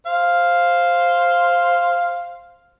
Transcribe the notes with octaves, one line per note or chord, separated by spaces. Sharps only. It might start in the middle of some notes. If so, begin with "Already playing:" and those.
C5 F5